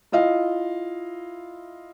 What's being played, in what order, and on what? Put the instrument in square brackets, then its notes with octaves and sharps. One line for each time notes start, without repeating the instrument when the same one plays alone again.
[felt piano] E4 F4 D#5 F5